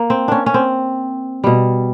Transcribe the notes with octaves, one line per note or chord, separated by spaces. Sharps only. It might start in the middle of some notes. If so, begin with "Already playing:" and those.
Already playing: A#3
C4
C#4 D4
C#4
C4
B2 G3